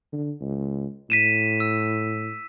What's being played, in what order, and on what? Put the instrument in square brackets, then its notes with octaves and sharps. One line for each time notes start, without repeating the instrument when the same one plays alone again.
[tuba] D3
C#2
[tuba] A2 [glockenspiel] B6 D#7 E7
[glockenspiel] E6